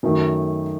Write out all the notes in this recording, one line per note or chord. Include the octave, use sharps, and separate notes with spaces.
F#2 D#3 F#3 A3